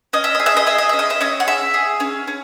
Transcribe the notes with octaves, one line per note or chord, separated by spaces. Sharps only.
C#4 D#5
E5
G#4 D#5
E5
D#5
G#4 E5
D#5
C#4 E5
D#5
E5
C#4 D#5
F#5
G#4 E5
G#4
C#4
C#4